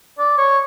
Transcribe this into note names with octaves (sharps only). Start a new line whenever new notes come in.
D5
C#5